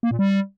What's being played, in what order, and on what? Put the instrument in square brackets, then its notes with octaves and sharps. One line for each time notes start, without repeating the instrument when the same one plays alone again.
[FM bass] A#3
A#2
G3